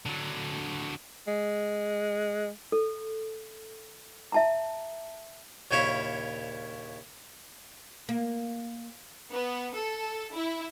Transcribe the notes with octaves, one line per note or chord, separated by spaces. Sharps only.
D3 F#3
G#3
A4
E5 A5 A#5
A#1 D#2 C#3 C#4 E4 C#5
A#3
B3
A4
E4